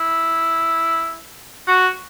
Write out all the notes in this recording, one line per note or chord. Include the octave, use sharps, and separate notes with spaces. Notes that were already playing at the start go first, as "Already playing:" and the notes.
Already playing: E4
F#4